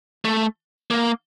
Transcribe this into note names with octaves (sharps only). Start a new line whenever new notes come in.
A3
A#3